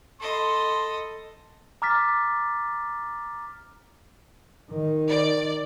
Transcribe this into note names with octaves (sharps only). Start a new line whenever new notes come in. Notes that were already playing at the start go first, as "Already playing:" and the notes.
A4 D#5 B5 C6
A#5 D6 F6 A6 B6
D#3
D5